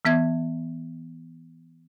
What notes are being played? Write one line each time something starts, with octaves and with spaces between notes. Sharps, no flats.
E3 B3 E5 G#6